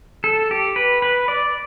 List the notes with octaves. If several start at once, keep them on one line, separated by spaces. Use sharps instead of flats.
A4
G4
B4
B4
D5